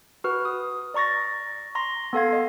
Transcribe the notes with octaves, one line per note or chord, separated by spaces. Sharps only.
F#4 B4 F6
D#6
D5 A#5 C#6 A6 A#6
A#5 C6 A#6
B3 A4 F5 G#6
D#5